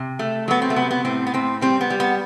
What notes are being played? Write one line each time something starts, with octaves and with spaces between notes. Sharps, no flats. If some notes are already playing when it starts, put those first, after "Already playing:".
Already playing: C3
A3
F#3 B3
C4
A3
C3 B3
B3
A2 C4
B3
A2 C4
G3 C4
B3
G3
B3